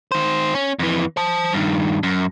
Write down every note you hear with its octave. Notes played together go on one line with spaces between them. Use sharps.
D#3 C5
C#4
F2 E3
C5 A5
G2 D#3
F#2